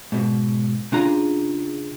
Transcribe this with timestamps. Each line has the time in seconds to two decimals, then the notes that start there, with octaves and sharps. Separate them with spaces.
0.12 G#2 B2
0.92 C#3 D4 F4 G#4 A#5